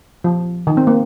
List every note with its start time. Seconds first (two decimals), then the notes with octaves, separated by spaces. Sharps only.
0.24 F3
0.67 D#3
0.77 C4
0.87 A#3